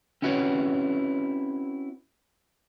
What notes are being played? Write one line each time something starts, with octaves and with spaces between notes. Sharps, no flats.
C4 C#4 E4 F#4 B4 C#5